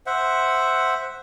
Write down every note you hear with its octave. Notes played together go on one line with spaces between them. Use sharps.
C5 E5 F#5